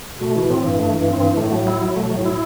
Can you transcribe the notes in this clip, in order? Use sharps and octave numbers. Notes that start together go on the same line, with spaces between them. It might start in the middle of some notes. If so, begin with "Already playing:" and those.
B2 A3
B2 E3
A2 C4
G2 E3
G2 A3
E3
G2
C4
G2
E3
A2 A3
F#3
E4
F#3
B2 A3
A2 F#3
E4